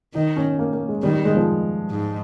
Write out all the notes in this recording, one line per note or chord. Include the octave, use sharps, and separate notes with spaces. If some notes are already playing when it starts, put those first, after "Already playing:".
D#3 D#4
C#4
A#3
A#3
G#3
D#3 G3
G3
G#3
F3
G#2